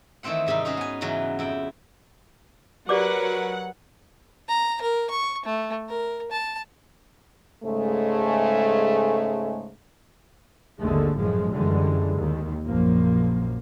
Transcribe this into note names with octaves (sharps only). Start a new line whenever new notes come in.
D#3 E3 A3 C4 C5 F#5
G#2 C3 G3 D#4
C#4 D#4 F#4 G#4 C5
B3 G#5
G#2 C#3 E3 F#3 B4
F2 E4 G5
F#3 G4 A#4 B4 D5 F#5 D6
A#5
A#4
C#6
A3
A#4
A5
G#2 C#3 G#3 A3
G#1 D#2 D3 G#3 A3
F#2 A2 F3 G#3
F#2 D3 E3 G3 G#3
D#2 D#3
A#1 F#2 F3 A#3